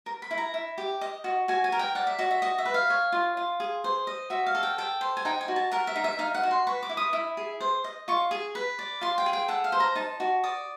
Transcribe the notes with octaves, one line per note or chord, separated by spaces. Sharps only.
A#4
B5
E4
A#5
E4
G4
D#5
F#4
F#4 G#5
G#5
A#4
G5
D5 F#5
E5
F#4 D#5
E5
F#4 D#5
E5
B4
F5
C#5
F4
F4
G#4
C5
D#5
F#4 E5
F5
A4
G5
A4 G5
C5
G#5
D#4 G5
G#5
F#4
A5
A#4 F#5
E5
D#4
E5
D#4 F5
F#5
F#4
C6
B4 C#6
D6
E4
D#6
E4
G#4
C5
D#5
F4 C#6
G#4
B4
D5
F4 C6
G5
G#4
G5
A4 F#5
F5
C5
A#5
D#4 A5
F#4
D5 D#6